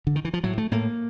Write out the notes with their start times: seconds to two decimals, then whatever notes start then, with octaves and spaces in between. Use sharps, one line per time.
0.07 D3
0.16 D#3
0.25 E3
0.33 F3
0.44 A2 F#3
0.58 A3
0.71 A2 A#3